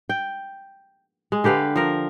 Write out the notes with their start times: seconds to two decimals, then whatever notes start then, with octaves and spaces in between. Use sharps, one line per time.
0.09 G5
1.32 G#3
1.44 D3 G4 B4 F5
1.76 F3 A#4